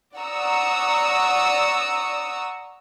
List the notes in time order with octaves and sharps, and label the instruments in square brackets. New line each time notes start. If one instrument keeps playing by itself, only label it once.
[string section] D5 F#5 A#5 C#6 D#6 E6